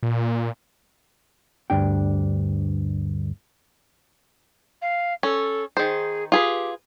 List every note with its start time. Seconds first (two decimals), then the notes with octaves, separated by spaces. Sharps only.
0.03 A#2
1.70 D2 G2 D4 G5
4.81 F5
5.23 C#4 A4
5.77 D#3 G#4 C5
6.32 F4 G4 G#4 B4